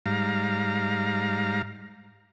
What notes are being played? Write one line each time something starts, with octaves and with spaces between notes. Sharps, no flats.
G#2 G3 F5 A#5